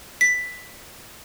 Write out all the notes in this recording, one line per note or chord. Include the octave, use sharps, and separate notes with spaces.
B6